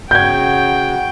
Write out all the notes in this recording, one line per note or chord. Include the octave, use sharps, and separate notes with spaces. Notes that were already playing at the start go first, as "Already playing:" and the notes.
C#3 F#4 F#5 G5 G6 G#6